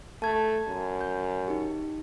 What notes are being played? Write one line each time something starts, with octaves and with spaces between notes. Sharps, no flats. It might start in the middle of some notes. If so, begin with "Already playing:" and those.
A3 A5 G#6
F#2
G6
D#4 G4